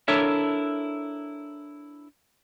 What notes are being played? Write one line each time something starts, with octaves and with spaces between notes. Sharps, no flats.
D4 E4 A4 A#4 C#5 E5